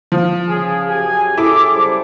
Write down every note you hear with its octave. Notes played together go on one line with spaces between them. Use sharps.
F3
C#3 G#4
F#2 G4 G#4 G#5
E4 A4 D6
C#3 G3 C5